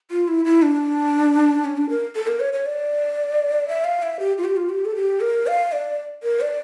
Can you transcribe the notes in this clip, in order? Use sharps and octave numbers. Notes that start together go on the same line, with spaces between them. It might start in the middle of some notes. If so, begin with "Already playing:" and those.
F4
E4
E4
D4
C#4
D4
A#4
A4
A#4
C#5
C#5
D5
E5
F5
E5
G4
F4
G4
F4
G4
A4
G4
A#4
F5
D5
A#4
D5